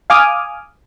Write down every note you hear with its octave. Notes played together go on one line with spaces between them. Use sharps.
F5 G#5 D6 D#6 F6